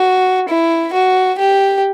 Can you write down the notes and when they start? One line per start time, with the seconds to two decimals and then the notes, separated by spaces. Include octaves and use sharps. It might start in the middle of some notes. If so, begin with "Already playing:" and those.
Already playing: F#4
0.49 E4
0.94 F#4
1.39 G4